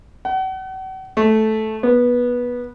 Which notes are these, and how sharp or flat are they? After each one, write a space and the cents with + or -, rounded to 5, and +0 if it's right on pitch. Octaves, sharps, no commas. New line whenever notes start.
F#5 +40
A3 -10
B3 -15